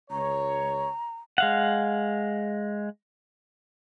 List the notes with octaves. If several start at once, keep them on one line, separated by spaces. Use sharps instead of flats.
C#2 C#5 A#5
G#3 F5 F#5